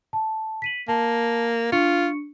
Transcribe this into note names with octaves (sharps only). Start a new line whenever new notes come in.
A5
B6 D#7 F#7
A#3 A5
D4 F4 C#6 C#7